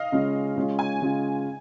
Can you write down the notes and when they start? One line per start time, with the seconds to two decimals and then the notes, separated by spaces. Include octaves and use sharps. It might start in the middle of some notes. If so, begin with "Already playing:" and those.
Already playing: D#5 F5
0.12 C#3 G#3 C#4 F4
0.56 C#3 G#3 C#4 F4
0.79 G#5
1.01 C#3 G#3 C#4 F4